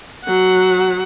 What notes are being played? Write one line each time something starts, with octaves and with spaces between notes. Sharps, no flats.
F#3 F#5